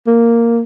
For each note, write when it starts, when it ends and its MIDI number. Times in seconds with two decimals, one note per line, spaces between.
0.07 0.62 58